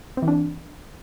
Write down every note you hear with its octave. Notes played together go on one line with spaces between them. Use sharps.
C4
E3
D4